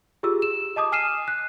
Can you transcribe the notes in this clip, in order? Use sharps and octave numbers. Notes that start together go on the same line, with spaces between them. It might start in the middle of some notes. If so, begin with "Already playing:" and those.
F4 G4 G#4 E6
E7
D#5 A5 D6 D#6
G#5 F6 C7 D#7 E7
F#6